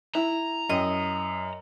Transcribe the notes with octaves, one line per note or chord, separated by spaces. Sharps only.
E4 A#5
F#2 D#5